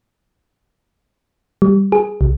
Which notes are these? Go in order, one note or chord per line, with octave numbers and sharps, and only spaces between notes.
G3
G#4
C2